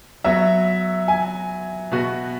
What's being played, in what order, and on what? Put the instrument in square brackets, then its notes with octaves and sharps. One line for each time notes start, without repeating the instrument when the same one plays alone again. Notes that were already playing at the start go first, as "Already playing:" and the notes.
[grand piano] F#3 B3 F#4 [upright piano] E5
[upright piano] G#5
[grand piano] B2 B3 F#4